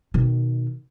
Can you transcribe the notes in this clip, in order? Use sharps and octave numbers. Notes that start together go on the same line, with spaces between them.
B2 D#3